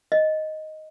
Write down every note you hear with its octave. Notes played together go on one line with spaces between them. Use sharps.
D#5